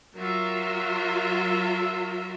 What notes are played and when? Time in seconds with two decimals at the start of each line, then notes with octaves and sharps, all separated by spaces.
0.16 F#3 F4 A#4 E5